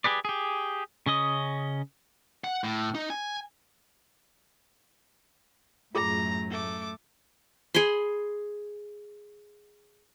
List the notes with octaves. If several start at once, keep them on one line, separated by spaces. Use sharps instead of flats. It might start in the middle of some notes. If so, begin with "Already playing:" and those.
G4 G#4 B4 D5
G4 G#4
C#3 C#4 D#5 D#6
F#5
A2
D#4
G#5
F#2 A2 F4 G#4 A#5
A3 D6
G#4 G#5 B5 C6